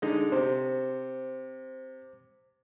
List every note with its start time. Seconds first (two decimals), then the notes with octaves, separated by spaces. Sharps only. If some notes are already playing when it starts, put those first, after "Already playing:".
0.02 D3 G#3 D#4
0.32 C3 C5